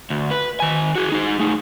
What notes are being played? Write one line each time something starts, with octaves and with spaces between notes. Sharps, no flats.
D2
B4
D#3 G#5
F#4 G#4
D#4 G#4
A3 D#4